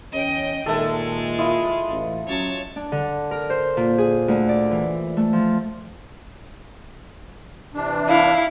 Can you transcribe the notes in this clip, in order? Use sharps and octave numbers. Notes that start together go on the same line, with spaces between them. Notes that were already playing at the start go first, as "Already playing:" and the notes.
E2 C#4 D#5 G5
A#2 D#3 G#3 A4 E5 A5
E4 F4 D#5
A1
F#3 C#4 C#5 A5
D4
D3
A#4
C5
A#2
G#4
D2
D5
E3
A3
F3
C3 E3 D4
E4 F5